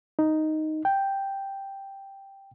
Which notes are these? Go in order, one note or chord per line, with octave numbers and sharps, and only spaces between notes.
D#4
G5